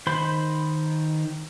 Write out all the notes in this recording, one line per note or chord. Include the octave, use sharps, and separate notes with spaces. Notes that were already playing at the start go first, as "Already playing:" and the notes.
D#3 C5 B5 C6 G6